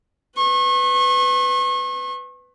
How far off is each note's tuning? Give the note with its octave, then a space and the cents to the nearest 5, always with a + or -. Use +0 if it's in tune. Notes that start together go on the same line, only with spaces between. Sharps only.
B4 +15 C#6 -40